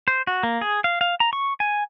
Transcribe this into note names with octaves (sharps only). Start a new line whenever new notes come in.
C5
F#4
A#3
G#4
F5
F5
A#5
C#6
G#5